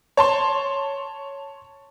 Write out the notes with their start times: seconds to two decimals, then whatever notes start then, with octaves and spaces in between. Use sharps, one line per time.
0.17 C#5 A5 C6